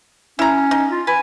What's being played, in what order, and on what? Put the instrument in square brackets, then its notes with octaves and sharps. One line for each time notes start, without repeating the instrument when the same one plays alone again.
[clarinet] C#4 [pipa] E4 A#5
[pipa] D#4
[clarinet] F4
[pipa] B4 [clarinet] G#5